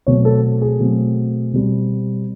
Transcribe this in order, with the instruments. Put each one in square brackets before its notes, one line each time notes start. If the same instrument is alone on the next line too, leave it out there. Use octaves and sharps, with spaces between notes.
[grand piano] B2 F#3 A3 C4 C#5
A4
G#4
B2 F#3 A3 C4
B2 G3 C4